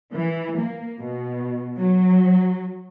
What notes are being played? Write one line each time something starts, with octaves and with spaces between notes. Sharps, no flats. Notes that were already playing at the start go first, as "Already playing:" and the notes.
E3
A#3
B2
F#3